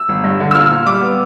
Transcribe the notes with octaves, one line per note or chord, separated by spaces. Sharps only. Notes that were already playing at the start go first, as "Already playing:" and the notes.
Already playing: E6
G1
G2
D3
E6
A#2 F6
A#2
G3 D6
B3